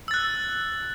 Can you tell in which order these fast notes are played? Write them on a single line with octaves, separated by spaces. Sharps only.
E6 A6 F#6